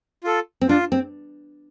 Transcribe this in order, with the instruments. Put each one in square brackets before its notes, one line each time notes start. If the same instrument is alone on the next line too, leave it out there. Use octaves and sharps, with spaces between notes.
[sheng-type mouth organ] F4 A4
[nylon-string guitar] C4
[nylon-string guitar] D4 [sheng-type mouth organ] F4
[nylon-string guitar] C4